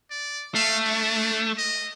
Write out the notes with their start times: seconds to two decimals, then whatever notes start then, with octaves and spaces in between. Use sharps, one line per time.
0.11 D5
0.55 A3 F5
0.85 D4
1.58 D#5